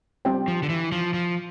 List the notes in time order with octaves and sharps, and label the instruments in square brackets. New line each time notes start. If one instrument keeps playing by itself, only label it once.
[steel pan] G3 C4 G4 C5 G5
[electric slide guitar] F3
D3
E3
F3
F3